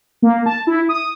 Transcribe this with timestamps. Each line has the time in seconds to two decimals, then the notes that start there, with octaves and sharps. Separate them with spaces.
0.22 A#3
0.46 A5
0.67 E4
0.89 D#6